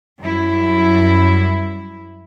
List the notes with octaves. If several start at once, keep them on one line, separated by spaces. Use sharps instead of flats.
F#2 G3 E4